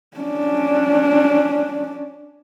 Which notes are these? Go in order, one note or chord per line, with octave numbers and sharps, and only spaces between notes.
C#4 D4